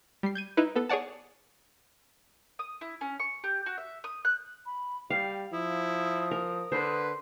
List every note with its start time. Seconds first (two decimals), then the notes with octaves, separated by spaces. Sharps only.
0.23 G3 C7
0.35 G6 G#6 D#7
0.57 D#4 E4 B4
0.76 B3 A4
0.89 G#4 C#5 D5 F#5 A5
2.59 D#6
2.81 E4
3.01 C#4
3.20 C#6
3.44 G4
3.66 F#4
3.78 E5
4.04 D#6
4.25 F#6
4.66 B5
5.10 G3 F5 G5
5.53 F3 E4 D#6
6.31 A#4
6.72 D3 B4 C5